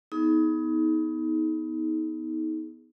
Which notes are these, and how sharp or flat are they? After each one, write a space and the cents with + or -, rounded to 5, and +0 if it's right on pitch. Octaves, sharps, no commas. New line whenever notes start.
B3 +0 D#4 +30 G#4 +20